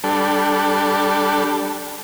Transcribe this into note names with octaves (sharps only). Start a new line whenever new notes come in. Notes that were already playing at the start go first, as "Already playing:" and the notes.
G3 D4 A4